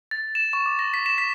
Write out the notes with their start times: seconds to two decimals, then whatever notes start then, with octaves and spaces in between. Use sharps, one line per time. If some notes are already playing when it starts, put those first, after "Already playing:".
0.11 A6
0.35 E7
0.53 C#6
0.66 D6
0.79 A#6
0.94 B6
1.06 E7
1.18 B6